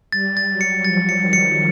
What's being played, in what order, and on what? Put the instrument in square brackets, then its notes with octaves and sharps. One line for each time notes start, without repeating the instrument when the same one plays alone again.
[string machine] G3 [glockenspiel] A6
[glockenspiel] A6
[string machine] F#3
[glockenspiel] C#7
[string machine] F3 [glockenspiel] A6
[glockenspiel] C#7
[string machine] D#3
[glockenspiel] C#7